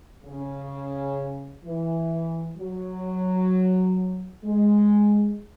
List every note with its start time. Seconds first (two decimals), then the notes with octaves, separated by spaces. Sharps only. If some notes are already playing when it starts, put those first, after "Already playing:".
0.24 C#3
1.63 E3
2.57 F#3
4.44 G#3